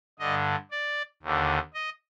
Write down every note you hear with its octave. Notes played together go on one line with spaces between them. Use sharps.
G2 D3 D#5
D5
D#2 D3
D#5